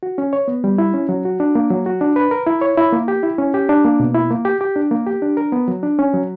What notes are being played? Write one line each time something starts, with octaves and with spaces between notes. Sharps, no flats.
F#4
C#4
C#5
B3
G3
E4
C#4
F#3
F#4
D4
A#3
F#3
F#4
D4
B4
A#4
E4
C#5
E4
A#3
G4
E4
C#4
G4
D4
A#3
B2
E4
A#3
G4
G4
D4
A#3
G4
D4
A#4
B3
F#3
D4
C#4
F#3